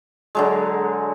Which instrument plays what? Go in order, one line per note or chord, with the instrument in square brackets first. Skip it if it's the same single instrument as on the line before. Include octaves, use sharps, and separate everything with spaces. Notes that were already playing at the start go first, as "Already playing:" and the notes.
[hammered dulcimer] D3 F#3 G#3